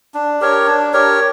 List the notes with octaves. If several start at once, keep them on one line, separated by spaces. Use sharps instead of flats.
D4
G4 A#4 C#5
D4
G4 A#4 C#5